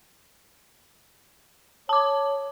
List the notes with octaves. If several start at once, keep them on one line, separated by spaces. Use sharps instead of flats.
C#5 A5 D6